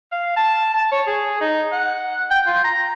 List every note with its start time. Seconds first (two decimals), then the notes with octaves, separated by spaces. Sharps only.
0.12 F5
0.37 A5
0.74 A5
0.92 C#5
1.07 G#4
1.41 D#4
1.72 F#5
2.31 G5
2.47 F4
2.64 A#5